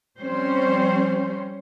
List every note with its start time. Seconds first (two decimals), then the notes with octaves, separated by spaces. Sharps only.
0.18 F3 G3 C4 C#4 C5